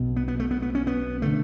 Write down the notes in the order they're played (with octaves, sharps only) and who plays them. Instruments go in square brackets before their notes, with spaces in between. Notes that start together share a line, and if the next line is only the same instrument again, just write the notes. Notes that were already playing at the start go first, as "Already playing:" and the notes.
Already playing: [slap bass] B1 B2
B3
B3
A3
B3
B3
C#4
B3
D3 A3